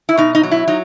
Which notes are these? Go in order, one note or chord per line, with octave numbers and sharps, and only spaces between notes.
E4
B2 D#4
D#4
F#3
E4
F#3 D#4